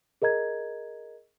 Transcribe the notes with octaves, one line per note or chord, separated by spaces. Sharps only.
G#4 A#4 D#5 A#5 G#6